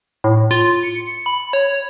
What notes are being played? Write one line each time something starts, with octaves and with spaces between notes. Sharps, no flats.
A2
F4
C#7
B5
C#5